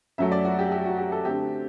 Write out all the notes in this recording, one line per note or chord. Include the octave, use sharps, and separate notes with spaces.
F#2 F#3 A3 E5
D5
F#4
G4
G4
F#4
G4
A4
D3 A3 C4 G4